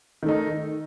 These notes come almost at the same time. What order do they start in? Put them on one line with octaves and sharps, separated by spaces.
D#3 A3 D#4